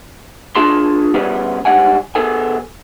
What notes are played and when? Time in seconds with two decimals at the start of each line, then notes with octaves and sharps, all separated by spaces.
0.55 D4 F4 G#4 A5 C6
1.14 G3 B3 C#4 G#4 B4
1.65 G#2 D#3 G3 F#5 G#5
2.15 B3 G#4 A4 G#5